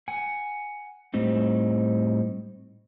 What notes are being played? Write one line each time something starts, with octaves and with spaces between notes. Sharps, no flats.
F#5 G#5
A2 G3 C4 D#4